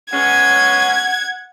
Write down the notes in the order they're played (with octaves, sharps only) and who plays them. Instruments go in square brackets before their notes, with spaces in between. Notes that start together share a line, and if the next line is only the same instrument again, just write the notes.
[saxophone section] G#3 B3 C#4 [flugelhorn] F#5 [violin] G#6